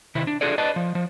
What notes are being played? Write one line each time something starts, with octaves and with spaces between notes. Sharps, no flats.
C3 D#3 E4
D4
D4 F4 F#4 G#4 A4 D5
B4 D5 D#5 A5
F3
F3